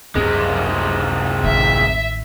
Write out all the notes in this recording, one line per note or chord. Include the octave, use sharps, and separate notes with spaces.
G#1 C#2 F#2 C3 G#3 C4
A1 D#3 E5 E6